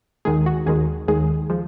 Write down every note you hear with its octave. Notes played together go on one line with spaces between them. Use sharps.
D#2 D#3 G#3 G#4
F#4
D#2 D#3 G#3 G#4
D#2 D#3 G#3 G#4
F3 G#3